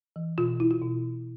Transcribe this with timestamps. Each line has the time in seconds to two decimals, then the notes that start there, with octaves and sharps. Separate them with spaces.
0.16 E3
0.38 B2 F4
0.49 F4
0.60 E4
0.71 F4
0.82 B2